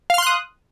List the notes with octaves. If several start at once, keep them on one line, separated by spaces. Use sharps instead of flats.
F5 C6 D#6 F6 F#6